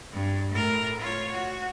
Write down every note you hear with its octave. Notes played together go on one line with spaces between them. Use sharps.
G2
A2 A#4
F4 C#5
F#4